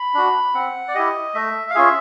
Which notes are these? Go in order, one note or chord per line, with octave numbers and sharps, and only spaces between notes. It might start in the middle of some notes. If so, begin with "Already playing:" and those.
Already playing: B5
D4 F#4
C4 F#5
D5
E4 G4 D#5
A3 E5
F5
C#4 F4 G#4 E5